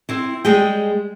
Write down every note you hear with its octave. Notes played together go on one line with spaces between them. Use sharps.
C4 E4
G3 G#3 G#4 G5